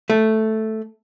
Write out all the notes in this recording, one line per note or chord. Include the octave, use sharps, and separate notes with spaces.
A3